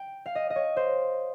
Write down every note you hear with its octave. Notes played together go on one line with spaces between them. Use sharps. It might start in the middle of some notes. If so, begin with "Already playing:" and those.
Already playing: G5
F5
D#5
D#5
C#5
C5